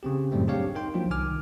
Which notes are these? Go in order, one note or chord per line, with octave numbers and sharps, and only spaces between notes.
C#3 C4 G4
F#2 A2 F#3 G3 A3 C4
C4 D4 G4 G#4 C#5 F5
D#4 A#4 G5 C6
F3 F#3 A#3 D4 F4
C2 D#3 G#5 D6 F6